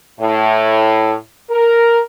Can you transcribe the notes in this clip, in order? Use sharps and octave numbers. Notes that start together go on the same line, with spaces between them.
A2
A#4